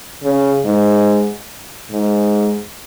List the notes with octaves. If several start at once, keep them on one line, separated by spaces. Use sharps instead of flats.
C#3
G#2
G#2